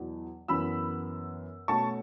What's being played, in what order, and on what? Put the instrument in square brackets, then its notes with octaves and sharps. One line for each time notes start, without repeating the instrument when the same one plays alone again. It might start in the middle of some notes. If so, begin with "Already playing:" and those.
Already playing: [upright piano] E2 B2 F#3
F#2 E3 B3 B5 E6
B2 A3 C#4 A5 C#6